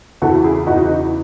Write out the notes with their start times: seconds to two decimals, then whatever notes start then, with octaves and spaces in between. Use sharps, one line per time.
0.22 E2 C#3 E3 F#4 A4
0.44 E4 G#4
0.67 E2 C#3 E3 D#4 F#4